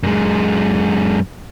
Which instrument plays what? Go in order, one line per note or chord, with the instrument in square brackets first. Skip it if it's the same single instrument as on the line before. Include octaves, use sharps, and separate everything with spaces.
[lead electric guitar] F#2 G#3